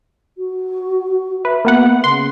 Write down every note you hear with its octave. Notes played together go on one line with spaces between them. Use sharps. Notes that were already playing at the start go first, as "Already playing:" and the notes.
F#4
B4 E5
A#3 B3 F#5
C#3 C6